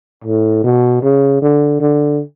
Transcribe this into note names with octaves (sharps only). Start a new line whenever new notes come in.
A2
B2
C#3
D3
D3